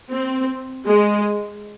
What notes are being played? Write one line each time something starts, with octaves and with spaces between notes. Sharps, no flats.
C4
G#3